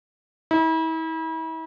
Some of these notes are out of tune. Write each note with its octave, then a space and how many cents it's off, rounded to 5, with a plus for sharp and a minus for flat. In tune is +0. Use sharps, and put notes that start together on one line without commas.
E4 -40